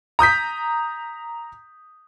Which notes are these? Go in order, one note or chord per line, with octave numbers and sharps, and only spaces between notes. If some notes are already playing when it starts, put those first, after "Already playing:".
A#5 D#6 G6 B6